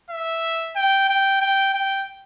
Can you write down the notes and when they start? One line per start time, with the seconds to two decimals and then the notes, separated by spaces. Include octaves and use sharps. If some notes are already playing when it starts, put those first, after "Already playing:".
0.11 E5
0.76 G5
1.09 G5
1.41 G5
1.74 G5